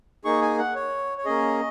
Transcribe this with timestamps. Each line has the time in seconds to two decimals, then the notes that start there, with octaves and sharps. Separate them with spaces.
0.25 A#3 D#4 G#4 C#6
0.42 G#5
0.59 F#5
0.75 C#5
1.18 C#5
1.25 A#3 C#4 G#4 D#5